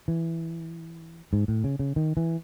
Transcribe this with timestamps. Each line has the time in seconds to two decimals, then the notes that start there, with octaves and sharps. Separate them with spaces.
0.08 E3
1.33 G#2
1.48 A2
1.64 C#3
1.79 C#3
1.96 D#3
2.17 E3